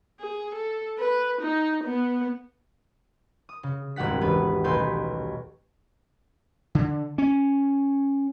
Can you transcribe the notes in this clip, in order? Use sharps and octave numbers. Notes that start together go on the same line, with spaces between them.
G#4
A4
B4
D#4
B3
D#6
C#3
D#1 G#1 G4 F#5 B6
E1 B3 B4
D#1 B1 A3 B4 C6 G6
D3
C#4